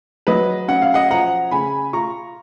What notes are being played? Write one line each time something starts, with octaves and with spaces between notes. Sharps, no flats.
F#3 B4 D#5
C#4 F#5
F5
D#5 F#5
F3 F#5 A#5
C#3 G#5 B5
F4 A#5 C#6